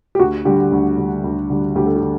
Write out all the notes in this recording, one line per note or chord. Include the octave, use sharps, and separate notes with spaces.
G4
D2 F#4
D3 G3 G4
D2
D3 G3
D2
D3 G3
D2 G4
A4
G4
D3